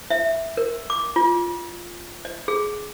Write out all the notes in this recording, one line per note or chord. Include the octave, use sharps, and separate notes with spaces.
E5
A#4
D6
F4
D#5
G#4